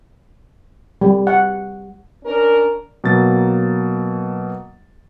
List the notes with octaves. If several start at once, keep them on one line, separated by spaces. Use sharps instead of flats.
G3
F#5
C#4 D4 A#4
B2 F#3 A#3 A6